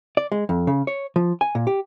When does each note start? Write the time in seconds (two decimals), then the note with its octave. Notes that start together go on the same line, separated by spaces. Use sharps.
0.17 D5
0.32 G#3
0.49 F2
0.67 C#3
0.87 C#5
1.16 F3
1.41 G#5
1.55 A#2
1.67 G4